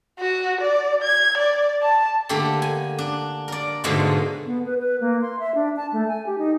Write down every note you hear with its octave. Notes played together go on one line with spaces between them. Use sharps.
F#4
D5
G#6
D5
A5
D3 A3 A#3 G4 A4
G#5
D4
A#4 D5
G#2 B2 D3 G#3 A3 F4
B3
B4
B4
A#3
C6
E5
D4
A5
A3
G#5
G4
D#4